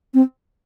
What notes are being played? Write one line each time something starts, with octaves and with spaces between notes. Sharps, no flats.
C4